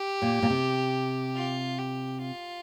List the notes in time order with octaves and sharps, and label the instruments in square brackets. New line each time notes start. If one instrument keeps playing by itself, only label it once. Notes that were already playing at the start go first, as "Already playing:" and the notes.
Already playing: [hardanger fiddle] G4
[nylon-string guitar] A#2
A#2
C3
[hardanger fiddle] F4
G4
F4